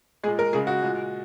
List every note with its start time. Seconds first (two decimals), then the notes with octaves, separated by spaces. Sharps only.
0.24 G#3 G#4
0.27 A#2
0.39 A#4
0.53 C#3 G#3 G#4
0.67 F#4
0.82 A#2 G#3